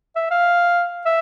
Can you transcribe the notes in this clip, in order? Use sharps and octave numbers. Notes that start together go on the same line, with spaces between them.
E5
F5
E5